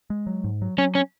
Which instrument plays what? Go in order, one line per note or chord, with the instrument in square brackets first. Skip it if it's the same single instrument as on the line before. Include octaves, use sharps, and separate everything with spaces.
[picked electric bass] G#3
F#3
G#2
F#3
[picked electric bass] F#3 [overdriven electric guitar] C#4
[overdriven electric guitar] C#4